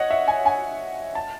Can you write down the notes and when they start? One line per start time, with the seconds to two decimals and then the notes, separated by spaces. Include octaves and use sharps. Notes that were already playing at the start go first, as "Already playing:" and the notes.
Already playing: C#5 D#5 F#5
0.11 E5
0.28 G#5
0.46 G#5
1.15 A5